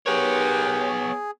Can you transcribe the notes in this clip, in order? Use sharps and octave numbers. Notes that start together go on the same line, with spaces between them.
B3 G4 G#4 A#4 B4 C#5